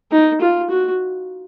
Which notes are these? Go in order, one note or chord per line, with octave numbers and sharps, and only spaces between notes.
D#4
F4
F#4